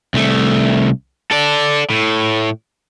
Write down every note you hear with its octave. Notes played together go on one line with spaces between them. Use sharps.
C2 A3
A4 D5
A2